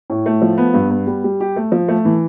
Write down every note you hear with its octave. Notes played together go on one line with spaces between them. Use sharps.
A2
A3
F3
B3
G2
B3
G3
G3
G4
A3
F3
A3
E3